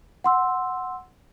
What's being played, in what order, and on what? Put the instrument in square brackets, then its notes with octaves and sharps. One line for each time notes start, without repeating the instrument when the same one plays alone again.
[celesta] F#5 C6 E6